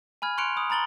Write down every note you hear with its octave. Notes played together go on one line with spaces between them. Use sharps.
G#5 B5 F6 G#6
C6 C#6 F#6 C#7 D7 F7
B5 D#6
A#5 B5 A6 F#7 G7